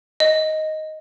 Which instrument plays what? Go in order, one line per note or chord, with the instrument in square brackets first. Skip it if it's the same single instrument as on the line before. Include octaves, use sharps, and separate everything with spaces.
[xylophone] D#5